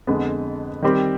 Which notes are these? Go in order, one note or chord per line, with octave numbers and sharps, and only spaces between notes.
F2 D3 G#3 B3
D#3 G3 C4 G4